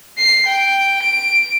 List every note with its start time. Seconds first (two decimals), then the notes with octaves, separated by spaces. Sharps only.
0.18 C7
0.47 G5
1.03 D7